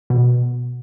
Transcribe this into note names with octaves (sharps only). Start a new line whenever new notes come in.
B2